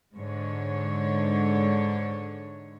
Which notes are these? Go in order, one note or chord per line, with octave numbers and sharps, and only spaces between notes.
G#2 D3 G#3 C#5